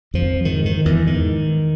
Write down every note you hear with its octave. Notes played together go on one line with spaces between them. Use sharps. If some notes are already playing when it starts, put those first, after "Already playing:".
F2 F3
G#2 D#3
D#3
E2 E3
G#2 D#3